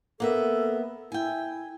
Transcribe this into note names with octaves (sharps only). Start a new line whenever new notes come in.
A#3 B3 A4 E5
E4 G5 G#5